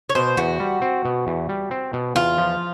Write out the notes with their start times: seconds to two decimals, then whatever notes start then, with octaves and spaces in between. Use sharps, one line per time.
0.09 C#5
0.15 B2 C5
0.37 E2 F#4
0.60 G3
0.82 C4
1.05 B2
1.27 E2
1.49 G3
1.71 C4
1.93 B2
2.15 E2 F4
2.38 F3